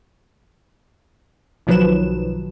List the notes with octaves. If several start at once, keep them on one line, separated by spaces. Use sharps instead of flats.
B1 D#3 F3 F#3 B4 E7